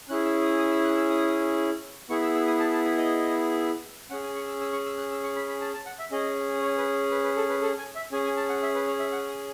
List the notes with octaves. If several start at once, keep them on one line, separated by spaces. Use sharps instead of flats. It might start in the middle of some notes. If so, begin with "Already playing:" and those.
C#4 E4 G#4 F#6
E6
D#6
D#6
E6
F#6
E6
D#6
B3 E4 G#4 C#6
E6
E6
D#6
A5
A5
B5
D#5
C#4 G#4 F#5
G#5
C#6
E6
E6
C#6
E6
F#6
E6
C#6
B5
B5
A5
A5
F#5
E5
C#4 G#4 D#5
C#5
B4
B4
B4
A4
B4
A4
G#5
E5
C#4 G#4 G#5
G#5
A5
F#5
E5
B4
C#5
E5
F#5
D#6